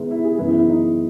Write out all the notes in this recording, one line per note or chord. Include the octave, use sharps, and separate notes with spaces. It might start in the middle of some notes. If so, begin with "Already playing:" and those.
Already playing: G#2 D#3 G#3 B3 E4
E4
G#4
F#2 E3 G#3 B3 E4
E4
E4
D#4